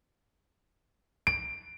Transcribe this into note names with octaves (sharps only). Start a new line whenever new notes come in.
D7